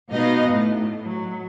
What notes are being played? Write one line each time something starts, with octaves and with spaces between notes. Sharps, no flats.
B2 B3 D#4 D#5 F5
A2
F#3